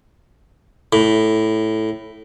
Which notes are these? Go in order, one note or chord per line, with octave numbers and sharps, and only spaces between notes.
A2